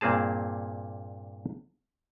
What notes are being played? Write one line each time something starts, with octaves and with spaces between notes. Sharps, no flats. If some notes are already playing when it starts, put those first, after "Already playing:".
G2 A#2 A#3 C4 G#4 A5